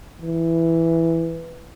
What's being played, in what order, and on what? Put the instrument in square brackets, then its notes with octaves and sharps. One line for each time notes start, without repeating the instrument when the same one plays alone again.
[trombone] E3